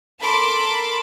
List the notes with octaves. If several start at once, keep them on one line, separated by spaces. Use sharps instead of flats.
A4 A#4 A5 B5 C6 D6